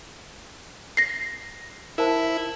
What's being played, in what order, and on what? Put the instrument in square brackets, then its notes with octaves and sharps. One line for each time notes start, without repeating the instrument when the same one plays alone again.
[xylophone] A#6 C7
[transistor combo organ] E4 [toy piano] A#4 C5 A5